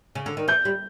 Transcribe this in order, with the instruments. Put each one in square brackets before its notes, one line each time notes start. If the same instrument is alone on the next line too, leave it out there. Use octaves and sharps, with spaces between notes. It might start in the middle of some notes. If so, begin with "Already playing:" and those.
[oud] C#3
D3
D#3
[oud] E3 [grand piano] G6
[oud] G3